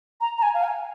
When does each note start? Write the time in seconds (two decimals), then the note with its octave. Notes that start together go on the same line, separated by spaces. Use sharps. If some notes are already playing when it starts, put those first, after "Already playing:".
0.21 A#5
0.38 A#5
0.42 G#5
0.54 F5
0.64 G#5